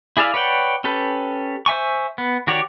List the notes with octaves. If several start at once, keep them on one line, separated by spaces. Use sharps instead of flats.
E4 G#4 D5 E5 F5
B4 C#5 D5 F#5 G5
C#4 G4 A4 B4
C5 E5 G#5 C#6
B3
D#3 F#4 G4 C#5 D5